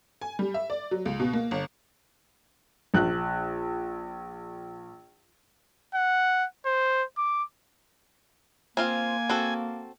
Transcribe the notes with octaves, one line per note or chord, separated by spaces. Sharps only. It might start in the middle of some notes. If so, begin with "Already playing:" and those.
G#5
G3
E5
D5
F#3
C#2
B2
A#3
G1
A#1 F#6
F#5
C5
D6
A#3 C4 F4 F5 G#5
C4 F#4 A4